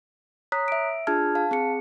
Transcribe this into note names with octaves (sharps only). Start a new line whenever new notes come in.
C#5 A#5 D#6 F#6 B6
E5 D7
D4 F4 G#4 A5 F6 G#6
F5 A5
C4 G#4 C#7